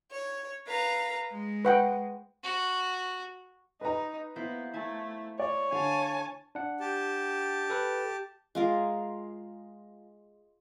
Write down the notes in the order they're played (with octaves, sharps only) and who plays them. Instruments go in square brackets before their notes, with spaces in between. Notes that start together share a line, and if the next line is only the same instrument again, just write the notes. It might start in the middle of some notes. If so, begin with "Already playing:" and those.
[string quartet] C#5
B4 F5 A#5
G#3
[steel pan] B4 F#5 G5
[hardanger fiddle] F#4
[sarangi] D#4 [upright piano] B4 A#5
[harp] A#3 E4 C5 [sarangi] B3
[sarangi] A3 [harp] E4 G#5 A5
[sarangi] C#5 [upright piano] D5
[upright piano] D3 [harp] F5 [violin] G#5 A5
[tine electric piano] D4 F#5
[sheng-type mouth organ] G4 A5
[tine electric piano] A4 B4
[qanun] G#3 F4 A#4